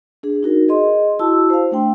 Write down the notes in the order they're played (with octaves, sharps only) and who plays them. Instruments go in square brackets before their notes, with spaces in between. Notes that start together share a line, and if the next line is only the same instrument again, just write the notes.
[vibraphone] D4 G#4
D#4 F#4 A#4
G#4 D#5 C6
E4 F#4 A5 E6
C5 F5
A3 D4 G5 C6